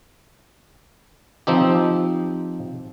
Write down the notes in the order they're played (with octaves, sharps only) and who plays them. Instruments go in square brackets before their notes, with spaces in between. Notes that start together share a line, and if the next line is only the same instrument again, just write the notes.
[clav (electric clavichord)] F3 C4 D#4 G4